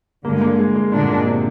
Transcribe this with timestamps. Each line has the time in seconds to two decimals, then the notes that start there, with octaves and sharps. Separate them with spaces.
0.25 G2 D3 G#3 A#3
0.41 A#3
0.59 G#3
0.76 G#3
0.92 G2 A#2 D3 G#3 D4
1.09 A#2
1.26 C3